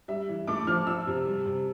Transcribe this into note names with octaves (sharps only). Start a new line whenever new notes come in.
G3 E5
E3
A3 D6
F3 F6
F3 E6
C3
G3
C3